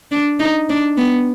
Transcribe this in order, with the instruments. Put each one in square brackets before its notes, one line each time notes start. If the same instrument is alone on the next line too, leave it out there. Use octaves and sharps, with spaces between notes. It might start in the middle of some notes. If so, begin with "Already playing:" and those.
[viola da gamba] D4
D#4
D4
B3